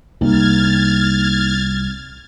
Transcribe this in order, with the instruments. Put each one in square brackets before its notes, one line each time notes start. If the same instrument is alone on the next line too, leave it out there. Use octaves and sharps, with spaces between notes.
[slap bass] C2 [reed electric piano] A#3 C4 D#4 [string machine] F6 G#6 A6